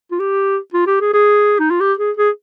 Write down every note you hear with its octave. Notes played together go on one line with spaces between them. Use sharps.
F4
G4
F4
G4
G#4
G#4
D#4
F4
G4
G#4
G#4